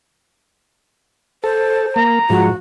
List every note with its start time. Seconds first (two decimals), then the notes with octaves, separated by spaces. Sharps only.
1.44 A4 C5
1.96 A#3 A#5
2.30 G#2 F3 F#4